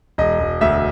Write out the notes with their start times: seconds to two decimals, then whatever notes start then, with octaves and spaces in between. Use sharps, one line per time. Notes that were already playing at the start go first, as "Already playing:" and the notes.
0.18 E1 D#5
0.40 E1
0.61 D2 E5